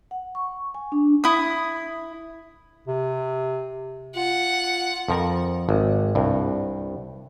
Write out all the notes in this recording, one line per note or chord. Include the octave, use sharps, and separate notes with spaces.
F#5
C#6
G#5
D4
E4 D#6
C3
F4 F#5
F2 F3 A#4
G#1
C2 G2